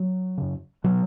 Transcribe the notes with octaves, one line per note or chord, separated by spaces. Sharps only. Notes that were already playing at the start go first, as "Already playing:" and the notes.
Already playing: F#3
F#2 C#3
B2 F#3